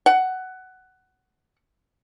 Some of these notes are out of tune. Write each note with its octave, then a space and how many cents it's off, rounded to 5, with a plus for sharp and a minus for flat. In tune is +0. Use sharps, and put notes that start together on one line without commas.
F#5 +15